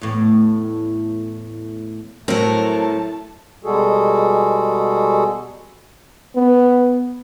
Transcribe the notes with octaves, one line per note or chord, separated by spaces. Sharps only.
E2 A2
A2 F#3 A3 C4 A#4 A5
B2 G3 G#3 F#4 G#4 A4
B3